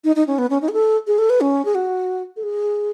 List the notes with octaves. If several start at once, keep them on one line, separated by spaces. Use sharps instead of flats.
D#4
D#4
C#4
B3
C#4
D#4
G#4
A4
G#4
A4
B4
C#4
G#4
F#4
A4
G#4